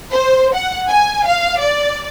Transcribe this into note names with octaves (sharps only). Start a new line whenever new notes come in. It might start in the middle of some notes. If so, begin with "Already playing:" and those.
C5
F#5
G#5
F5
D5